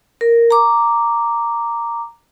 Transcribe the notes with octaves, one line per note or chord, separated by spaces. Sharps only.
A#4
A#5 D6